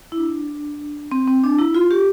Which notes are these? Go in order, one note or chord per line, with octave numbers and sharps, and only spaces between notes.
E4
D4
C4
C4
D4
E4
F4
G4